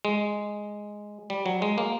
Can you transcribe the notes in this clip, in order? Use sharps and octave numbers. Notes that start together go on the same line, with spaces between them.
G#3
G3
F#3
G#3
A#3